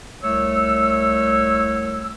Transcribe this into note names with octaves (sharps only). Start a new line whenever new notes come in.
C2 A3 C#5 E6